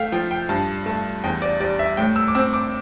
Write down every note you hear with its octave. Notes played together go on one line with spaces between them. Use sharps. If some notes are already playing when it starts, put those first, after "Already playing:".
Already playing: A3 F5 G5
F3 G5
G5
G2 A5
A3 A5
E2 G5
D5
G3 D5
E5
A2 G5
E6
D6
C4 E6
D6